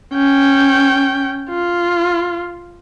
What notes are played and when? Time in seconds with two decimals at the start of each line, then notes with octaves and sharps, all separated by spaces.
0.14 C#4 G5
1.50 F4